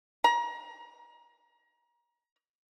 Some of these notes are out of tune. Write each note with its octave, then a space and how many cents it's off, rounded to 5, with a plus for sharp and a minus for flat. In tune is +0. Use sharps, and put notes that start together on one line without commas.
A#5 +30